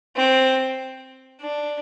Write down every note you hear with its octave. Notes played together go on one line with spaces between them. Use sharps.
C4
D4